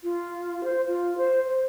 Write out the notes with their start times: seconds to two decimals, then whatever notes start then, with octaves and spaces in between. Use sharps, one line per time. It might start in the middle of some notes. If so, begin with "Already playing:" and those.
0.03 F4
0.64 C5
0.87 F4
1.18 C5
1.47 C5